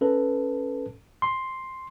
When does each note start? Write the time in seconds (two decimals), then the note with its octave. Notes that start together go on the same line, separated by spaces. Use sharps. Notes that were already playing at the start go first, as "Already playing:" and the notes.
0.01 C#4 A4 B4
1.22 C6